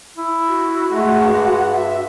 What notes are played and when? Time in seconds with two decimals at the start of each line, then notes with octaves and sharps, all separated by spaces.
0.16 E4
0.49 F#4
0.92 G#3 A3 F#5
1.22 G2
1.74 E5